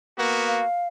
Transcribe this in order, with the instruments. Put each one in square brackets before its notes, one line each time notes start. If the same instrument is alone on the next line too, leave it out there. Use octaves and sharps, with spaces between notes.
[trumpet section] A#3 B3 F#4
[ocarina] F5